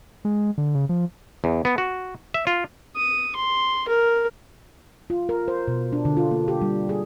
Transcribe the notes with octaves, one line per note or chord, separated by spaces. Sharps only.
G#3
D3
C#3
F3
E2
B3
F#4
E5
F4
D#6
C6
A#4
F4
A#4
C5
B2
D4
D3
F4
A#3
G4
G3
G#4